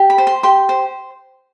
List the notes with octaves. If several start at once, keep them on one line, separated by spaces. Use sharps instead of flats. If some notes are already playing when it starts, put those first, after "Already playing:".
Already playing: G4
B5
C5
C6
G4 C6
C5